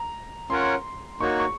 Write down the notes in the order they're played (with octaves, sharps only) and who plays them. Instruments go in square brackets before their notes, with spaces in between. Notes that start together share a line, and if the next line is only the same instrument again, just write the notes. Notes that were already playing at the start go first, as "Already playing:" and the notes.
Already playing: [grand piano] A#5
[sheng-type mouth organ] C#4 F4 A#4 C#5 F#5 [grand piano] C6
[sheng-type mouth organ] A#3 D#4 F#4 C#5 [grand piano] C#6
[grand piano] C#6